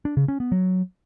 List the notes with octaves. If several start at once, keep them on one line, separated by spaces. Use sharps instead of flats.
D4
C#3
C#4
B3
F#3